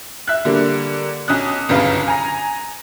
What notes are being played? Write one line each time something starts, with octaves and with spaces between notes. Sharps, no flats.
E5 F#6
D3 G3 A#3
B1 C#4 D#6 F#6
G1 C2 F#2 C#3 B4 F5
G#5 A#5